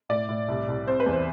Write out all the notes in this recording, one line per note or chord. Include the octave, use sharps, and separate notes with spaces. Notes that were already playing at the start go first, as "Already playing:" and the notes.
A2 D5
A2
C2
C2
C4 C5
B4
E2
C5